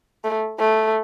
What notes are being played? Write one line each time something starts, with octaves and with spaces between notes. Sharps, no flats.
A3
A3